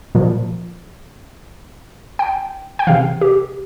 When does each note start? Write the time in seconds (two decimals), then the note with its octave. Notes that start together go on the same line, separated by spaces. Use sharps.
0.15 A#2 F3
2.19 G5
2.79 G5
2.87 C3 E3 F5
3.21 G4